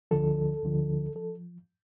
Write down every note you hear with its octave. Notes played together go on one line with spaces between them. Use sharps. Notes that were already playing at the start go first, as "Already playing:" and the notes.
D2 D3 F3 A4
D2 D3 F3
F3 A4